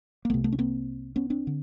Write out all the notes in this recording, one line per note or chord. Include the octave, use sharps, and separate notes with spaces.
A#3
C2 C3 A3 B3
A3 B3
C#4
A#3 C4
B3 C#4
C4 D4
D3